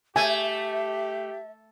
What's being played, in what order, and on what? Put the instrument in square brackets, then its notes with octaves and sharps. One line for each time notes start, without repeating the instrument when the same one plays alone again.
[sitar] A3 [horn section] G4 [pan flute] E5 [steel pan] G#5